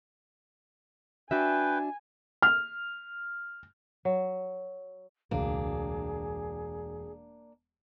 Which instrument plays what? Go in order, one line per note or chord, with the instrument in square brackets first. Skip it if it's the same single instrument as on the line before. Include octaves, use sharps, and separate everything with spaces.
[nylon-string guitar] D4 F#4 E5 [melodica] B4 G5 [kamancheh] G#5
[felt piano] F6
[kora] F#3
[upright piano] E1 [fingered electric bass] C#2 A2 [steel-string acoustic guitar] A#3 D4 [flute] G#4